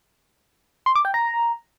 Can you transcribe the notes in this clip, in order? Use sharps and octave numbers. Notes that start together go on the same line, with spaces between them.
C6
D6
G5
A#5